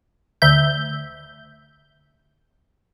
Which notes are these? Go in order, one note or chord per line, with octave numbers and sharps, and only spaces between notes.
D2 E5 G6